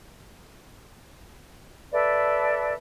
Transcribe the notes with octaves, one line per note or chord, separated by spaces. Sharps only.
A4 B4 D5 E5